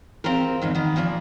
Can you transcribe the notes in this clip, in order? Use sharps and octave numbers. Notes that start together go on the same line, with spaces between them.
C4 F4 G4 A#4
E2 G#2 D#3
D#3 B3
A#2 F3 A#3 C#5 D5